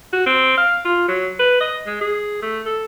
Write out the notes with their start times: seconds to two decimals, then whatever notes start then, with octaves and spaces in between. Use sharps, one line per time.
0.13 F#4
0.26 C4
0.57 F5
0.85 F4
1.08 F#3
1.39 B4
1.60 D#5
1.87 G#3
2.01 G#4
2.42 A3
2.66 A4